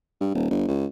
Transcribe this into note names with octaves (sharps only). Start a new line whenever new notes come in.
G2
D#1
G1
C#2